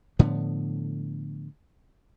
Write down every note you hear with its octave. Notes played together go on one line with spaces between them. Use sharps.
A2 D3 F3 B3